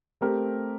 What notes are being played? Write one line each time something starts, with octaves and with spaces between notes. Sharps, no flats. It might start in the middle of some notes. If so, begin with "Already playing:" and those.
A3 C4 G4 A#4